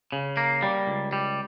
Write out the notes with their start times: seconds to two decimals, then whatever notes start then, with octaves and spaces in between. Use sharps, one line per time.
0.12 C#3
0.37 A#3
0.63 G3
0.87 C#2
1.13 G3